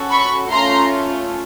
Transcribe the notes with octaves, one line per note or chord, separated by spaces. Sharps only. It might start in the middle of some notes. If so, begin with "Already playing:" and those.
Already playing: C#4 F#4 A4
B5 C#6
A3 C#4 F4 A#5 C6